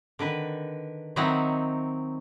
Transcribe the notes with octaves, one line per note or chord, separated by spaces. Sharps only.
D3 D#3 B4
D#3 F#3 C4 D#4 E4 F#5